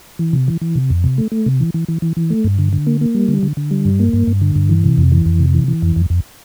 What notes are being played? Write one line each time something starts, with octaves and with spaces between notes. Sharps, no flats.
E3
C3
E3
E3
C3
F2
C3
A3
A3
C3
E3
E3
E3
E3
E3
A3
G2
D3
D3
A#3
A#3
G3
D3
D3
D3
G3
G2
A#3
G2
G2
D3
G2
E3
C3
F2
E3
F2
C3
E3
E3
F2
F2
F2